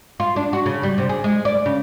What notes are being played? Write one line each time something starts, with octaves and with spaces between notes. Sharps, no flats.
F4
D4
F#4
C#3
G3
C3
G#4
G#3
D5
C#3